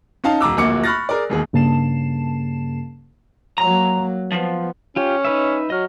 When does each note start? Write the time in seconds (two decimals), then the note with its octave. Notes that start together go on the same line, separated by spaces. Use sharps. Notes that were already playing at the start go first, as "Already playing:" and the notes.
0.24 C#4 D#4 F5 A5
0.41 E1 A#5 D6 E6
0.57 D1 A#1 A#3 F#4 D6 C#7
0.84 B5 C#6 F6 F#6 A6 A#6
1.09 G#4 A#4 D5
1.30 E1 D#2 G#4
1.53 G2 C#3 A#3 A5 C7 E7
3.58 F#3 A#3 A#5
4.32 F3 B3
4.96 C#4 F4 G4
5.25 D#4 B4 E5
5.70 F#3 D#5 F6